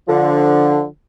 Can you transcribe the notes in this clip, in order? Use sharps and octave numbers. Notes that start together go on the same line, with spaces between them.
D3 F3